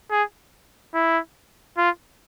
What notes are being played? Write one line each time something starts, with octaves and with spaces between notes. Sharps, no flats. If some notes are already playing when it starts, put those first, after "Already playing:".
G#4
E4
F4